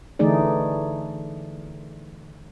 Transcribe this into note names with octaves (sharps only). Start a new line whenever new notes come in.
D3 E3 A3 D#4 G#4 D5